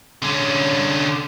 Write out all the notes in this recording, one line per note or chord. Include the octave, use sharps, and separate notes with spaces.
D3 C#4